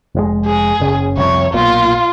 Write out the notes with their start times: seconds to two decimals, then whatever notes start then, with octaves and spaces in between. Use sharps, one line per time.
0.15 F1 G#2 G#3
0.46 G#4
0.80 F#1 C#3
1.17 C2 F2 C#5
1.54 B1 A#2 F4